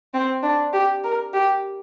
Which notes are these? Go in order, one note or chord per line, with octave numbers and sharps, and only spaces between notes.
C4
D4
G4
A#4
G4